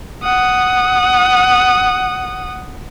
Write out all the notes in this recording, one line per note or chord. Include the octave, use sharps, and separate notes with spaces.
F#5 D#6